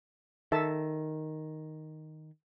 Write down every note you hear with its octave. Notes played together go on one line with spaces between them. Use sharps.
D#3 A4 E5 A5